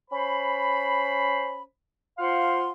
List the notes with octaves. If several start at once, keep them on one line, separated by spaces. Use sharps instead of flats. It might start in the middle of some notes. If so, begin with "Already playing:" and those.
C#4 C5 B5
F4 C5 F5 F#5 C6